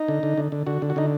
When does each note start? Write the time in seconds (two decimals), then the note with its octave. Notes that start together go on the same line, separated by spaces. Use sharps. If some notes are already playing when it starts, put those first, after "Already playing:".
Already playing: D#4
0.08 D3
0.23 D3
0.38 D3
0.52 D3
0.67 D3 F#4
0.82 D3
0.90 F#4
0.96 D3 D#4